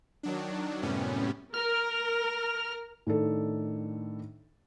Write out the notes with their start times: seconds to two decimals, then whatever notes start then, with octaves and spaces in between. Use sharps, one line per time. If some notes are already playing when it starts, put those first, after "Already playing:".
0.23 D#3 F#3 D4
0.82 F#2 A2 C3 G3 B3 C#4
1.54 A#4 F6
3.07 A2 D#3 D4 A4